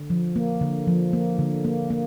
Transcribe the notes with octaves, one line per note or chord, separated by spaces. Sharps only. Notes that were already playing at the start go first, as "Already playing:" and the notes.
Already playing: D3
F3
A#3
D3
F3
A#3
D3
A#3
A#3